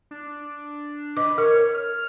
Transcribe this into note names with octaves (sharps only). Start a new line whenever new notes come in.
D4
B4 D#5 D6
A#4 C#5
F6